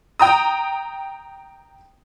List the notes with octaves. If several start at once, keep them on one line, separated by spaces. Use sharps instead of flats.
G5 A#5 D#6